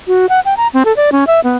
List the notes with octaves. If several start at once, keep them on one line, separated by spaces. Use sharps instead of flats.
F#4
F#5
G5
A#5
C4
A4
D5
C#4
E5
B3